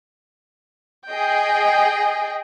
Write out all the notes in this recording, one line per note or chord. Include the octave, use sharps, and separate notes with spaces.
G#4 D#5 G5